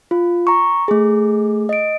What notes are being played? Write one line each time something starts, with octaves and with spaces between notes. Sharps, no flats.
F4
A#5 C#6
A3 G#4
D#5 D7